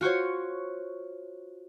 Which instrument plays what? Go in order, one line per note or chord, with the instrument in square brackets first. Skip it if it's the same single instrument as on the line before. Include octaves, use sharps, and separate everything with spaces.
[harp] F4 F#4 C5 C#5